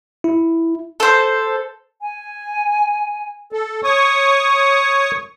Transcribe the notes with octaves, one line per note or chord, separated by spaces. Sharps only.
E4
A4 C5
G#5
A4
C#5 C#6 D#6